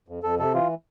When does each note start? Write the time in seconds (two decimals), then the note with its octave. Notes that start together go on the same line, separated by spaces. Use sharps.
0.08 F2
0.23 F2 A4
0.39 C3 A4
0.54 E3 F4